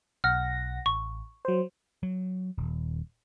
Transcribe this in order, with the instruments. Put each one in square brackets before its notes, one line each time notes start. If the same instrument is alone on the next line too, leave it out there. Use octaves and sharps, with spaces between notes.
[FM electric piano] B1 F#5 A#6 [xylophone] F6
[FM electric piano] A1 [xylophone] C#6
[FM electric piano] F#3 C5
[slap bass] F#3
D#1